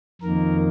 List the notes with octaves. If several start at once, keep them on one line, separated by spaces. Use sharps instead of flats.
F2 D#3 A#3 A#4